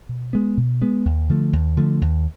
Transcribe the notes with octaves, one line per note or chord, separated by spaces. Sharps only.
B2
G#3 B3
B2
G#3 B3
D#2
D3 F3 A3
D#2
D3 F3 A3
D#2